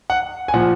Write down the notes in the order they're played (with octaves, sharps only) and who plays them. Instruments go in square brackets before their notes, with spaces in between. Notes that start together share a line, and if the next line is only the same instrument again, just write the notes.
[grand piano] F#5
G#5
A#2 F3 F#5